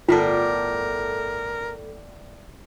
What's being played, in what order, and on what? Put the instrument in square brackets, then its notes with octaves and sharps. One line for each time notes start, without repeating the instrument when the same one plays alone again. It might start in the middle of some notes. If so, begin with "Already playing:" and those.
[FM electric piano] G1 A4 [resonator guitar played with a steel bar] A2 G3 B3 [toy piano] F4 [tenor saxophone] A#4